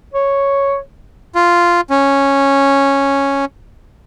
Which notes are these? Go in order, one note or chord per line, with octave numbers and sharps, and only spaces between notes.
C#5
F4
C#4